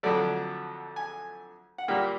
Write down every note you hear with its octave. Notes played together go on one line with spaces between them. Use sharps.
F2 D3 F#3 A3 D5
G#5
F#5
A#2 G3 A#3 G5